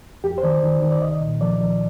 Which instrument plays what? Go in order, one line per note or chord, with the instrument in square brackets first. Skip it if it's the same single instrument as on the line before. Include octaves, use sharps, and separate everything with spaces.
[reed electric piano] F2 G4
C5
D#3 D5
D#3
D#3
D5
C2 D#5
A#2
F3 D5
F3